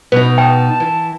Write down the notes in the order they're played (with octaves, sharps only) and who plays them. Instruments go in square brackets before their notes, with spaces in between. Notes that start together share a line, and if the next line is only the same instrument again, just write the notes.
[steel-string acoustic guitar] B2 D#4 [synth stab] B4
[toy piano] G5 [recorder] A5
[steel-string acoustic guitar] E3